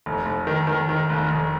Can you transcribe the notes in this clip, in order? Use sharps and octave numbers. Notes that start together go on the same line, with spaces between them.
F1
F1
D#3
D#3
D#3
F1
F1